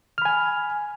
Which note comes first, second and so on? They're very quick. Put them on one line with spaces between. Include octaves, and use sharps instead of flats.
F6 B5 G#5